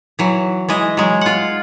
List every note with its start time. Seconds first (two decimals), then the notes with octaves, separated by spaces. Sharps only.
0.19 E3 F#3
0.69 E3 G#3 D#5
0.97 F#3 G#3
1.21 F4 F#5